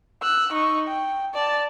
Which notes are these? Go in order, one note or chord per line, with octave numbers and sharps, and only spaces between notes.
E6 F#6
D#4 C#6
G5
D5 A5